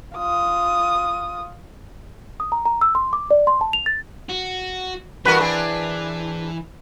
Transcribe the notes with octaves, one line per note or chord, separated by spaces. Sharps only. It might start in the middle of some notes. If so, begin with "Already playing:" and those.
F4 D#6
D#6
A#5
A#5
E6
C6
D6
D5
C6
A5
F7
A6
F#4
G2 E3 F#4 A#4 B4
C4 D4 G#4